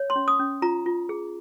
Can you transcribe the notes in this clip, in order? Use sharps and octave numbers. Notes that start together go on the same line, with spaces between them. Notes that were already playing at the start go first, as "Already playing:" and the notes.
Already playing: C#5
C6
C#4
D#6
C#4
F4 A#5
F4
G#4